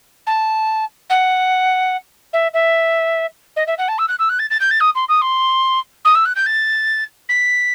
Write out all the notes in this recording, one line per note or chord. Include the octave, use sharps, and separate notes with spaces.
A5
F#5
E5
E5
D#5
E5
F#5
A5
E6
F#6
E6
F#6
A6
A6
G6
A6
D#6
C6
D#6
C6
D#6
E6
F#6
G6
A6
B6